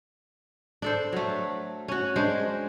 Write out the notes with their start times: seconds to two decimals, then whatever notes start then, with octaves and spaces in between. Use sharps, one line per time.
0.82 D4 A4 C5
1.13 F#3 A3
1.88 C#4 F#4
2.16 G#3 D4 C5